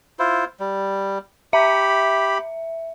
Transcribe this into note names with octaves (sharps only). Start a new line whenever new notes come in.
E4 F4 C5
G3
G4 E5 B5